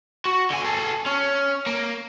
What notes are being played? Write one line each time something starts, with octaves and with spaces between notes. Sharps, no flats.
F#4
D3 G#5
G#4 A4
C#4
A#3